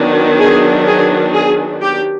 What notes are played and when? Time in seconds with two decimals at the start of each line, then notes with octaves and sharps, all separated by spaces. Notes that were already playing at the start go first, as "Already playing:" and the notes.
Already playing: D#3 F#3 B3 D4
0.39 G#4
0.86 G#4
1.34 G#4
1.81 G4